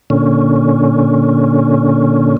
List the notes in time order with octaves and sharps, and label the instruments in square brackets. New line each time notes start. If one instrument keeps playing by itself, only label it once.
[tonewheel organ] A#2 D3 C#4